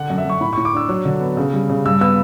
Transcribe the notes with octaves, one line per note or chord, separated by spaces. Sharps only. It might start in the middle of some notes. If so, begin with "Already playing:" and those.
Already playing: D3 F#5
F#2
E5
F#2 C#6
A2 B5
C#6
A2
D6
D4 E6
F#3
D3
B3
C#3
G3
C#3
G2 E6
B3 E6